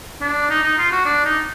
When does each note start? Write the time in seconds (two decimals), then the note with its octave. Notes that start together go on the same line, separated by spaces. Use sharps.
0.21 D4
0.50 D#4
0.63 D#4
0.78 F4
0.91 F#4
1.05 D4
1.25 D#4